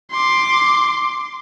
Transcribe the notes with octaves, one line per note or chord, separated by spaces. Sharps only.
C6 D6